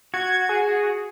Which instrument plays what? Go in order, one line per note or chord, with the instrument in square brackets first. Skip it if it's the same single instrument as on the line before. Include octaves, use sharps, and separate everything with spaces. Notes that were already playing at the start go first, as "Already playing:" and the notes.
[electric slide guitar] F#4 [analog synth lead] G#6
[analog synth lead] G#4